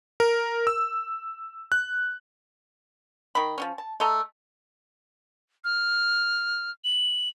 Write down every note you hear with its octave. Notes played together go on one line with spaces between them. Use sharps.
A#4
E6
F#6
D#3 D#5 B5
F3 F#3 C#4
A5
A3 A4 D#5 A#5
F6
F#7